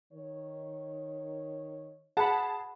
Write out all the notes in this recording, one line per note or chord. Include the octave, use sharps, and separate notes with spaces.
D#3 C#5
G#4 F#5 A5 B5